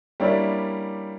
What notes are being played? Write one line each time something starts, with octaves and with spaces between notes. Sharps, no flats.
G3 A#3 C#4 D4 E4 D5